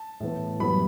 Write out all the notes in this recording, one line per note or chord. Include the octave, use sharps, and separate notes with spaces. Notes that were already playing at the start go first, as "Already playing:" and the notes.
Already playing: A5
A2 E3 B3
F#2 E3 G3 B3 B5